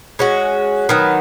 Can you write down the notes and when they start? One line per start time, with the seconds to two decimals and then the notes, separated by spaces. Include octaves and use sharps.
0.19 G#3 C#4 F#4
0.89 D#3 F#3 B3